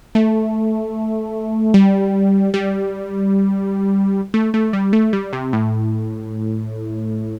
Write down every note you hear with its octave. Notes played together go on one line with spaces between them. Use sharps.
A3
G3
G3
A3
A3
G3
A3
G3
C3
A2